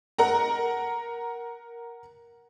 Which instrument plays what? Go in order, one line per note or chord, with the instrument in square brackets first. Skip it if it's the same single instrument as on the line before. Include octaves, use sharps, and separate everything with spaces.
[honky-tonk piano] A#4 F#5 A#5